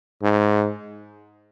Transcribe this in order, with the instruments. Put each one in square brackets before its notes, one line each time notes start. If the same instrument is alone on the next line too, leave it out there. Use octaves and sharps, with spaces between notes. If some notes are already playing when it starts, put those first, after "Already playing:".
[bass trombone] G#2